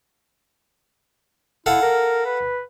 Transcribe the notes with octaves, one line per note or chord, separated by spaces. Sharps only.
E4 A4 F5 F#5
A#4
B4